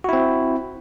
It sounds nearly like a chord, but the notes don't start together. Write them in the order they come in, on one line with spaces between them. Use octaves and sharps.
F#4 E4 C4